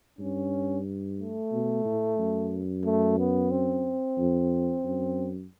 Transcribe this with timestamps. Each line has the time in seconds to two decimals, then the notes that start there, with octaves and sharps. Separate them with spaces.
0.19 G2 C#4
1.19 A3
1.52 B2
1.85 A2
2.18 F#2
2.85 A3
3.19 B3
3.51 C4
4.18 F2
4.85 F#2